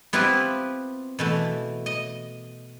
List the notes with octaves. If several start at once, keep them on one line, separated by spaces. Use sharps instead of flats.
B3 C4 E4 F4 G4 B4
B2 E3 A3
D#5